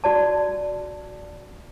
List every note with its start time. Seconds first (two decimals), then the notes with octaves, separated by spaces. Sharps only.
0.04 F#4 D5 A5